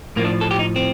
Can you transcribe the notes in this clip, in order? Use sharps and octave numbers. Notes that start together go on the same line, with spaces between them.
A2 F3 A#3
D4
A4
G4
D#4
C4